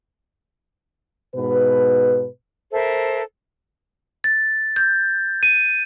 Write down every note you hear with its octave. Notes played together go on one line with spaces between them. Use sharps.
G#2 B2 B4
A4 A#4 C5 E5
A6
G6
D#7